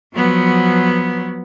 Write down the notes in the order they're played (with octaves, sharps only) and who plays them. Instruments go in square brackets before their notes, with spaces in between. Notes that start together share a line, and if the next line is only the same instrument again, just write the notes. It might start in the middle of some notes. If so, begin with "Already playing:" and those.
[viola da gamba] F3 F#3 B3